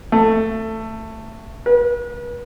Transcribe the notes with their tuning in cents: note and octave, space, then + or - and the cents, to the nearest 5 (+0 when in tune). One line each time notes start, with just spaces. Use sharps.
A3 +15
B4 -40